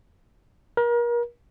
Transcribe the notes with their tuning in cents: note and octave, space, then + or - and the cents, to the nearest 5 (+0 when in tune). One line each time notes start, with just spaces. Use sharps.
A#4 +35